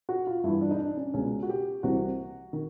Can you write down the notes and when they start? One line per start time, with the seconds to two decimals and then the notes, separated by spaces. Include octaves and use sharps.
0.09 F#4
0.27 F4
0.44 G2 E3 E4
0.61 D4
0.71 D#4
0.79 D4
0.97 C#4
1.14 C#2 B2 C#4
1.43 F#4
1.49 G4
1.83 C2 C3 E3 F#4
2.53 D#3